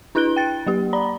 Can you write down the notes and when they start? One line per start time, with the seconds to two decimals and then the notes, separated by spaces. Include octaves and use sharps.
0.15 D4 E4 B4 F#6 D7 G7
0.36 G5 A6
0.66 F#3 A#3 G4
0.93 D5 A#5 B5